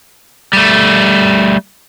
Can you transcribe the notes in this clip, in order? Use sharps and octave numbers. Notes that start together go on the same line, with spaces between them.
G3 A3